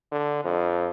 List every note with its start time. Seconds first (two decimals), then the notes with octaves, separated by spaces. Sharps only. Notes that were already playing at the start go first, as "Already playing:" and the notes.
0.12 D3
0.45 F2